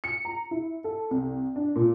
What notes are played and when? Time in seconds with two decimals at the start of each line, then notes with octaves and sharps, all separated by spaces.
0.04 C#7
0.25 A#5
0.51 E4
0.84 A4
1.11 C2
1.56 D4
1.76 A#2